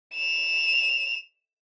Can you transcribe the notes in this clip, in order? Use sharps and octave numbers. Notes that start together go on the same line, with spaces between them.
E7 F7